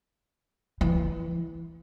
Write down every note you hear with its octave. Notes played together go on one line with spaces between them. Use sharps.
E3